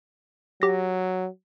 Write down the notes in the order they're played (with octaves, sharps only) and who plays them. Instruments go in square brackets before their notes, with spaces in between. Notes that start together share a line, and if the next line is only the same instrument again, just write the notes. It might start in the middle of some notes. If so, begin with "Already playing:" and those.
[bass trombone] F#3 [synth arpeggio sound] G4 A#6